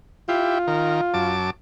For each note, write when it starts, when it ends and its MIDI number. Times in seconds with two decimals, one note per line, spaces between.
0.29 0.58 64
0.29 1.34 65
0.29 0.58 67
0.67 1.01 51
0.67 1.01 70
1.14 1.50 42
1.14 1.50 81
1.14 1.50 86